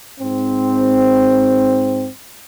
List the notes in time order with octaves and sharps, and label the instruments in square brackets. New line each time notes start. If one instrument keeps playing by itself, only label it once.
[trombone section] G#2 C4